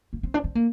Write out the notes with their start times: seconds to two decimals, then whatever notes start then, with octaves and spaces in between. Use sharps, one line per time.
0.13 A#3
0.23 C4
0.34 D4
0.44 C4
0.55 A#3